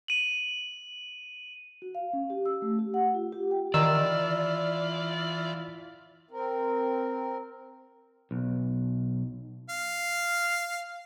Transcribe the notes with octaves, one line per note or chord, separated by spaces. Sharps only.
D#7 F#7
F#4
F5
C#4
G4
E6
A3
G4
F#5
F4
G4
G5
D#3 E3 F4 D5 E6
C4 A#4
B1
F5